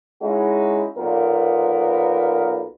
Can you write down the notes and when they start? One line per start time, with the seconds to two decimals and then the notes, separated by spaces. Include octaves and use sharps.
0.21 G#3 C#4 D#4 E4 F#4
0.96 B1 A#2 B3 A#4